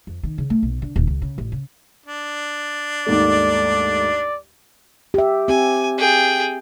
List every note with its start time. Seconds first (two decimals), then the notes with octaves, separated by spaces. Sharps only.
0.07 F2
0.23 D#3
0.38 C#3
0.50 A3
0.63 B1
0.82 D3
0.96 D#1
1.07 C#2
1.22 C#3
1.38 A1
1.52 C#3
2.06 D4
3.07 D#2 G#2 A3 D5
5.14 G4 E5
5.48 C4 G4 G#5
5.98 G#4 G5